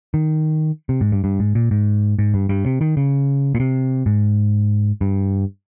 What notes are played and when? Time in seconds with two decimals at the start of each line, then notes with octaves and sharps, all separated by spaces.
0.14 D#3
0.89 C3
1.01 G#2
1.12 G2
1.24 G2
1.40 G#2
1.55 A#2
1.71 G#2
2.19 G#2
2.34 G2
2.49 G2
2.66 C3
2.81 D#3
2.97 C#3
3.55 A#2
3.60 C3
4.06 G#2
5.01 G2